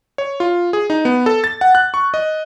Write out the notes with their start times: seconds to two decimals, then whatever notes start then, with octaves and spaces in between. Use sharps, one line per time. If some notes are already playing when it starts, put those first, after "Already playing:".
0.18 C#5
0.40 F4
0.73 G#4
0.90 D#4
1.05 B3
1.26 A4
1.44 A6
1.61 F#5
1.75 F#6
1.94 C#6
2.14 D#5